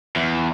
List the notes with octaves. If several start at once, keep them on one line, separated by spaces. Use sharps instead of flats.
E2